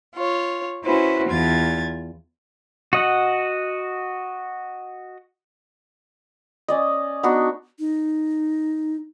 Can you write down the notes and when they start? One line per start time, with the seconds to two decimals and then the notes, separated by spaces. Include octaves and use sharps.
0.15 F4 C#5
0.85 C#4 E4 F#4 B4 C5
1.29 E2 F4 G#6 A6
2.93 F#4 D#5 F#5
6.68 C#4 D5 D#5
7.23 B3 D4 D#4 F#4
7.79 D#4